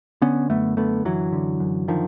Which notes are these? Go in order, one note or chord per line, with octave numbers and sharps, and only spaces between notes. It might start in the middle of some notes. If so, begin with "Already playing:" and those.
D3 B3 C#4
F#2 A3 B3
D3 A3 B3
F#2 E3 F#3
D3
F#2
D3 D#3 F3